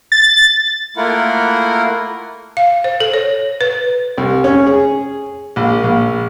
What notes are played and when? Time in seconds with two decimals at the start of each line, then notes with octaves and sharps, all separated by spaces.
0.12 A6
0.97 A3 A#3 E4 F4 A#4 F#5
2.57 F5
2.84 C5
3.00 A4
3.14 C#5
3.61 B4
4.18 C2
4.44 C#4
4.66 G#4
5.56 A#1
5.84 A#1